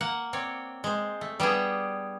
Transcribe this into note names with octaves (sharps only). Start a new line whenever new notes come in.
A#3 F#5
C4 C#5 D5
G#3 C5
A3
G3 B3 D4 G#4